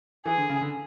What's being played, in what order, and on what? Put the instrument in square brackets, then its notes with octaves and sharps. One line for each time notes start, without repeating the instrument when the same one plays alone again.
[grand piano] E3 [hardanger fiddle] G#4
[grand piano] D3
C#3
D3